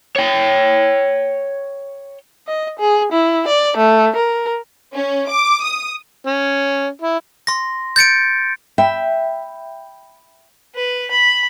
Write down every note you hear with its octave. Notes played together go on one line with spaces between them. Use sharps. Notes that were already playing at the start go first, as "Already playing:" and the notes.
C#5 G5
D#5
G#4
E4
D5
A3
A#4
C#4
D6
D#6
C#4
E4
C6 A#6
G6 A6 C#7 D7
E5 G5 B5
B4
B5